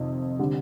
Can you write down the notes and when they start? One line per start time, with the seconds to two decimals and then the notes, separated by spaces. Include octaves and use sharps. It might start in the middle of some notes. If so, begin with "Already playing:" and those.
Already playing: F2 C3 D#3
0.39 D3 G3